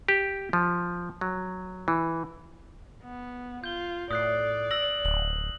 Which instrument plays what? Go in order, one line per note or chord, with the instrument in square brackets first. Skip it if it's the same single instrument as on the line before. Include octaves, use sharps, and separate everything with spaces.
[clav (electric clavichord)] G4
F3
F#3
E3
[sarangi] B3
[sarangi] F4 [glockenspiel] G6 G7
[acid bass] A2 [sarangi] D5 [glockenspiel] D#6 F#6 C7
[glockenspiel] E6 A#6 F#7
[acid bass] D1 [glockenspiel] F#7